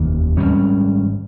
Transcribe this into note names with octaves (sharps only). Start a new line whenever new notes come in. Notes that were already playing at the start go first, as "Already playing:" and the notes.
Already playing: F1 D#2 D#3 A#3
G#1 G#2 G3 C#4